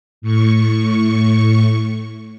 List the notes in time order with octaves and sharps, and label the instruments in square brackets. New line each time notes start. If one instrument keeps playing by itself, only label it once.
[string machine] A2 C#6